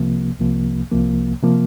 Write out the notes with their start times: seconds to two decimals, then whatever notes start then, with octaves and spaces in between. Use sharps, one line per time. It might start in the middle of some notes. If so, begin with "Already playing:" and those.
Already playing: C2 C3 F3 A#3
0.40 C2 C3 F3 A#3
0.91 C2 C3 F3 A#3
1.43 C3 F3 A#3